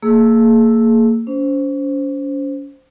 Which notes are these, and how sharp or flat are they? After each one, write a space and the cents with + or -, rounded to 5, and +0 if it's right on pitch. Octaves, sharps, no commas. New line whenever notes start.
A#3 -30 G#4 +20 E6 +0
C#4 +35 C5 +0